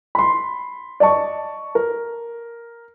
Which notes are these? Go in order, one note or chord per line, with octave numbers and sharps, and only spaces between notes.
B5 C6
D5 D#5 A5 C#6
A#4